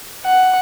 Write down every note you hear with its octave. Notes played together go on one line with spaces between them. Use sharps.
F#5